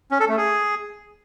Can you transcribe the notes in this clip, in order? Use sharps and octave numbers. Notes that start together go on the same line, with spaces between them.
C#4
A4
A3
G#4